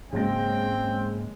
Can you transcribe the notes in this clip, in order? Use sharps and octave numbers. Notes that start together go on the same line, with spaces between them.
G#2 C#3 F#3 G#3 A#3 C4 G5 A#6